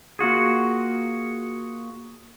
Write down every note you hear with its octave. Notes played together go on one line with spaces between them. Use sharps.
A#3 F4 F#4 G#4